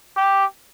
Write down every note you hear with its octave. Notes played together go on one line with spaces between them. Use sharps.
G4